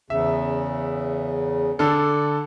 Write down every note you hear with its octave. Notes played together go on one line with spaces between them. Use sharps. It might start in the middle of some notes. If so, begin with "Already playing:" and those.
E2 C#3 E5
D3 A4 D5